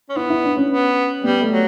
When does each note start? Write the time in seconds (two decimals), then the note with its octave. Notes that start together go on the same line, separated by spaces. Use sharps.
0.09 C#4
0.16 B3 E4
0.30 E4
0.43 D4
0.57 C#4
0.70 B3
1.24 G3 B3
1.41 A3
1.51 F#3